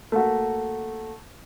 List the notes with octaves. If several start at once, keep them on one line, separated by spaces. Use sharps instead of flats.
A3 A#3 F#4